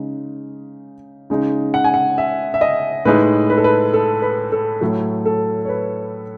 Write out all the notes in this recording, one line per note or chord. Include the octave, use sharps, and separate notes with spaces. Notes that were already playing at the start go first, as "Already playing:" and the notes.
Already playing: C#3 G#3 D#4
C#3 G#3 D#4
F#5
G#5
F#5
E5
E5
D#5
A2 G#3 D#4 B4
B4
A4
B4
A4
B4
A4
A2 F#3 A3
A4
C#5
B4